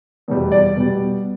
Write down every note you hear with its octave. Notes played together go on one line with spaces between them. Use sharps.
E2 B2 G3
D5
B2 G3